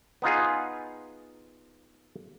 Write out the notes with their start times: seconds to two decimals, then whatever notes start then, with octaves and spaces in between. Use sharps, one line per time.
0.22 B3 D#4 F4 G#4